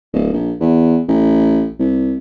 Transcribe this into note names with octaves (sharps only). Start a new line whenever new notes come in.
D1
A#1
E2
A1
C2